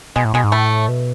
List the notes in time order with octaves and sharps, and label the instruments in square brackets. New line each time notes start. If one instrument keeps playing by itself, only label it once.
[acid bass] B2 [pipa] G#3
[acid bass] A2
[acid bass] B2 [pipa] G#3
[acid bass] G#2
[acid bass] A2 [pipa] A3
[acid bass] B2